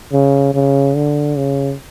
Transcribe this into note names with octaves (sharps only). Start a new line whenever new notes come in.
C#3
C#3
D3
C#3